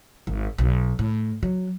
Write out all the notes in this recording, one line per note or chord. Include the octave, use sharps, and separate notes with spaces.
G#1
B1
A2
F#3